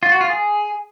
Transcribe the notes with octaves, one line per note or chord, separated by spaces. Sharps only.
F4
F#4
F4
G#4